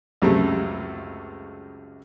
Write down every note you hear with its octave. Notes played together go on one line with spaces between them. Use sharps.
C#2 F#2 C3 G#3 A3